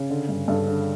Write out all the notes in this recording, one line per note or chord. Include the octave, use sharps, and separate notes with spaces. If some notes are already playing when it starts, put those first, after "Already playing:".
Already playing: C#3
D3
G2
G2 A4
D3